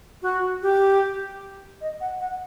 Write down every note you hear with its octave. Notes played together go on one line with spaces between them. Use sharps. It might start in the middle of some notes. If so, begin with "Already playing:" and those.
F#4
G4
D#5
F#5
F#5